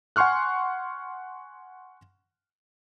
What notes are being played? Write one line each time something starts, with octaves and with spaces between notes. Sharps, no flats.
F#5 G#5 C6 C#6 F6 F#6